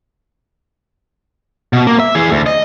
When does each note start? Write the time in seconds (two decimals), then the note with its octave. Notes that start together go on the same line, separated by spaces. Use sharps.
1.73 B2
1.87 A#3
2.00 E5
2.15 E3 G#4
2.31 D2
2.46 D#5